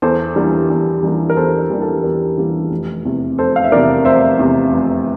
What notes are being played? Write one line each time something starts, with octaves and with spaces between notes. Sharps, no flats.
E2 A4 C5
E3 G3 A#3 D4
E2
E3 G3 A#3 D4
A#4
E2 A4 C5
A#4
E3 G3 A#3 D4
A4
E2 A#4
E3 G3 A#3 D4
F1
E2 C3
F1 A4 C5
F5
E5
E2 C3 A#4 D5
F1 C5 E5
E2 C3
F1